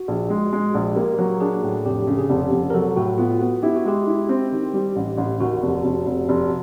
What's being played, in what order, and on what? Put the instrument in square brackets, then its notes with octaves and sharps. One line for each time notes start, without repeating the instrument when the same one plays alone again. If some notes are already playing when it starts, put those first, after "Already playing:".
Already playing: [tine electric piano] F#4
[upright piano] A#1
G#3
G#3
A#1
[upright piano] A#3 [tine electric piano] G4
[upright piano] F#3
[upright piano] D4 [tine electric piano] G#4
[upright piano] A2
[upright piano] F1 [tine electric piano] G4
[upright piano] C#3
[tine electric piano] G#4
[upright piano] F1 [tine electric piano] G4
[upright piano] F1
[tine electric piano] A#4
[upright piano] F#3 [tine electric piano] A4
[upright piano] A2 [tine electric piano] F#4
[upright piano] B3 [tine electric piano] F4
[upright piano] B3 [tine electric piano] F#4
[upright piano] E4 [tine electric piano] G4
[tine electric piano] F#4
[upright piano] G#3 [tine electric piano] G4
[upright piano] E4
C4
D#3
G3
A1
A1
[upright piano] D#2 [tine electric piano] F#4
[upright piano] F1
F1
F1
F1